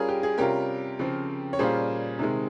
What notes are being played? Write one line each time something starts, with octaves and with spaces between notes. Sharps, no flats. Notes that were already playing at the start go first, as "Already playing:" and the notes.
Already playing: G3 C#4 F4 G#4 A#4
G4
G#4
C3 G3 C#4 F4 G4 A#4
C#3 F3 C4
C#5
A#2 G3 C#4 F4 G#4 C5
C3 D#3 G#3